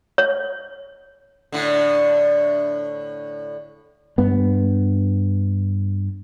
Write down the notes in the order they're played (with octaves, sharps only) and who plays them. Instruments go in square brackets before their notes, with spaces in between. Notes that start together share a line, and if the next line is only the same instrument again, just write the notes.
[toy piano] C#5
[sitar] A2 D3
[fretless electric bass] G2 B3